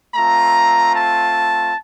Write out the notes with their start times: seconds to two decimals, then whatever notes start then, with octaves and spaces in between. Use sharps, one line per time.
0.14 A3 C4 F4 A#5
0.94 A5